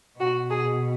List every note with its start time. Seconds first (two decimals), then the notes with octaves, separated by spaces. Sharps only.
0.20 B2 F#4
0.51 G#4